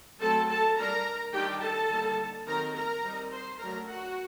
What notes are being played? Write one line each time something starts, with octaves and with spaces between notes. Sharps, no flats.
F#3 A3 C4 A4 A5
A4 A5
G3 D4 A#4 A#5
D#3 G3 D4 G4 G5
A4 A5
D3 G3 A#3 D#4
D#3 F#3 C4 D#4 A#4 A#5
A#4 A#5
G3 C4 D#4
C5 C6
F#3 A3 D4 A#4 A#5
F#4 F#5